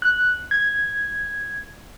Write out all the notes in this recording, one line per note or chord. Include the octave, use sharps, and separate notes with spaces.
F#6
G#6